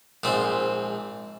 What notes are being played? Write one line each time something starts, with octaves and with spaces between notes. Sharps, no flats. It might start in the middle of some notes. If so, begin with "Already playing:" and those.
A#1 G#2 C4